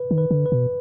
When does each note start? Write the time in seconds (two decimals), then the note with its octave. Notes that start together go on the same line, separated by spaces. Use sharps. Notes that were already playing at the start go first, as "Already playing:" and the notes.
Already playing: B4
0.11 D#3
0.18 B4
0.31 D3
0.46 B4
0.52 B2